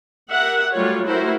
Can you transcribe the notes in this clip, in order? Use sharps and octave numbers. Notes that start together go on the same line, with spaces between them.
G4 A#4 E5 F#5
F#3 G3 A3 F4 C#5
A3 E4 F#4 A#4 C5